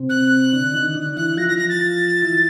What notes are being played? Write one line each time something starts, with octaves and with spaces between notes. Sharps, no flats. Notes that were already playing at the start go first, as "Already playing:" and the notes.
Already playing: C3 C4
F#6
D3 D4
D#3 D#4
D3 D4
E3 E4 F#6
F3 F4 A#6
A#6
A#6
A6
E3 E4